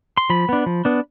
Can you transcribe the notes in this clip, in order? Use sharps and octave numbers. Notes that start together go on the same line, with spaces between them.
C6
F3 B5
B3 D4
F3
B3 D4